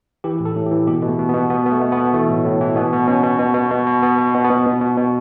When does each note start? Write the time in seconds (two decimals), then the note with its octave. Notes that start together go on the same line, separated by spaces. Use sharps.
0.24 E3 G4
0.40 A2
0.45 A4
0.56 A2
0.66 G4
0.71 E3
0.87 B2 G4
1.03 B2
1.08 A3
1.19 B2
1.29 B3
1.34 B2
1.50 B2 B3
1.66 B2 B3
1.72 A3
1.82 B2
1.92 B3
1.97 B2
2.13 E3 A3
2.29 A2
2.45 A2
2.61 E3
2.76 B2 B3
2.92 B2
3.07 B2 C#4
3.24 B2
3.39 B2
3.55 B2
3.71 B2
3.86 B2
4.02 B2 B3
4.18 B2
4.34 B2
4.44 B3
4.50 B2
4.66 B2
4.81 B2
4.97 B2